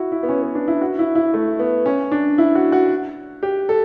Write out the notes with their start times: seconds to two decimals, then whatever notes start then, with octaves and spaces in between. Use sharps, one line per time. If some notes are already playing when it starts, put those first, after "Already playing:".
Already playing: E4 F#4
0.12 E4
0.23 B3
0.29 C#4
0.42 B3
0.55 D4
0.68 E4
0.82 F#4
0.99 E4
1.15 E4
1.34 A3
1.59 B3
1.86 C#4
2.12 D4
2.38 E4
2.55 F#4
2.72 F#4
3.43 G4
3.69 A4